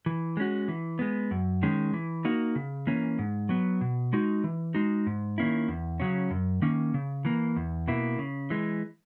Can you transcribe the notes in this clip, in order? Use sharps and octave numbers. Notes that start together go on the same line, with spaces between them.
E3
G#3 C#4 F#4
E3
G#3 B3
F#2
D#3 G#3 C#4
E3
A#3 D#4 F#4
C#3
E3 A#3 C#4
G#2
F#3 B3
B2
G#3 D#4 F#4
E3
G#3 D#4 F#4
G#2
D#3 A#3 C#4 E4
E2
C#3 F#3 C#4
F#2
D#3 A#3 C#4
C#3
E3 A#3
E2
B2 A#3 E4
C#3
E3 G#3